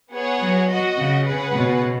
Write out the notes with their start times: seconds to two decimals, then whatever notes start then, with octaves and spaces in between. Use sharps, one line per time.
0.12 B3 G#4 C#5 F#5
0.40 F#3
0.69 F#4 D#5 F#5
0.96 C#3
1.25 C#4 G#4 B4 F#5
1.53 B2